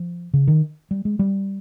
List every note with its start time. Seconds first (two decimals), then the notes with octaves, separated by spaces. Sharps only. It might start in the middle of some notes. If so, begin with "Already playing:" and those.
Already playing: F3
0.33 C#3
0.48 D#3
0.91 G3
1.05 G#3
1.19 G3